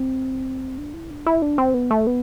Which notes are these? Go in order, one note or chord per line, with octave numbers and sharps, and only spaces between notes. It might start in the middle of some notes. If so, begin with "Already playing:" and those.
Already playing: C4
D4
E4
D4
E4
D4
C4
B3
A3
B3